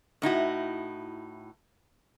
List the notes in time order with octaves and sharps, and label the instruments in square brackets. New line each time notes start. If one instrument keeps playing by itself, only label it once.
[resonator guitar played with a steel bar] A2 D#4 E4 F#4